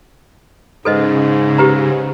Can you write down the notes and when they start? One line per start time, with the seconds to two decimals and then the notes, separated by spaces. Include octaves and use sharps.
0.85 G#2 C#3 A4 B4 D#5
1.58 G4 B4 A#5